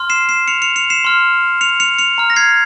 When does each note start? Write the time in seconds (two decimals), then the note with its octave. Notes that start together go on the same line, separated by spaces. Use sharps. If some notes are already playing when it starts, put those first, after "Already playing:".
Already playing: C6 F6
0.10 C7 E7
0.29 C7 E7
0.48 C#7 F7
0.62 C#7 F7
0.76 C#7 F7
0.90 C7 E7
1.05 C6 F6
1.61 C#7 F7
1.80 C#7 F7
1.98 C#7 F7
2.18 A#5 F6
2.30 A#6
2.36 G#6 C7